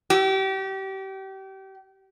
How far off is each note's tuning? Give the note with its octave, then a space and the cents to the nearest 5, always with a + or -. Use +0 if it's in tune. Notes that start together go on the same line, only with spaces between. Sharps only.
G4 -30